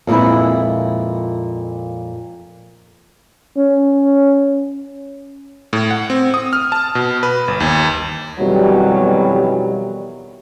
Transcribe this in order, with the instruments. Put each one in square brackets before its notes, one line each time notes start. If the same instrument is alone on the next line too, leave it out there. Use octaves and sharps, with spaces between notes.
[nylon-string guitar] F2 A#2 G#3 B3 E4
[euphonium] C#4
[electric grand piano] A2
F#5
C4
D#6
F6
A5
B2
B4
G1
D#2
[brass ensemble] F2 B2 D#3 E3 F#3 G3